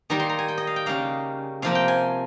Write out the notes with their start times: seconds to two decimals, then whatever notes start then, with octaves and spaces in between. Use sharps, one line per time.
0.10 D#3 G3 A#3 A#5
0.20 C6
0.29 A#5
0.39 G#5
0.48 G5
0.58 D#5
0.67 F5
0.76 G5
0.86 C#3 G3 A#3 F5
1.62 C3 F3 A#3 F5
1.75 G5
1.88 G#5